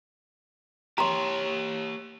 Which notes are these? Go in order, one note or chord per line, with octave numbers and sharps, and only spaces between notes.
G4 C#5 A#5 C6